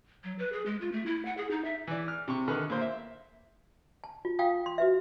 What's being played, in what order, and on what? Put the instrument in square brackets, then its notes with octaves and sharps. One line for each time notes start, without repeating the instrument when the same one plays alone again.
[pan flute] F#3
B4
G#4
G#3
F4
A3
E4
F#5
G#4
D#4
E5
[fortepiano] E3 D5
F6
C3 C#6
D3 D#3 B4 F6
A#2 A#3 C5
E5
[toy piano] A5
F4
F4 F5 G5 A5 D#6
C6
F#4 B4 E5